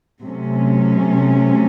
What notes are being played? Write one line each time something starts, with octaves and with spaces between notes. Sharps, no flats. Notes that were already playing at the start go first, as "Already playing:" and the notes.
C3 F#3 A3 C#4